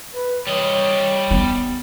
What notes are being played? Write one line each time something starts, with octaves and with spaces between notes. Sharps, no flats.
B4
G3 C#5 D#5
B3